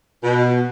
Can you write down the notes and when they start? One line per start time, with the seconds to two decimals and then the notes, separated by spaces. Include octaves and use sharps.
0.23 B2